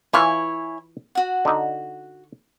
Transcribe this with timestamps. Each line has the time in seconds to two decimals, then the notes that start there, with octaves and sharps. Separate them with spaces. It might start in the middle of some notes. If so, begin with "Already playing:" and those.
0.13 E3 E4 F4 C#5 E5 G#5
1.15 F#4 F#5
1.45 D3 D#4